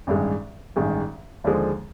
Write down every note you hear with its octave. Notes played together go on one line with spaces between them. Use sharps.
A1 G2 D#3 G#3
A1 G2 D#3 G#3
D#2 D3 F3 G#3